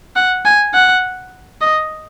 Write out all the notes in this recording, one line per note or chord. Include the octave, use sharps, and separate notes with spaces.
F#5
G#5
F#5
D#5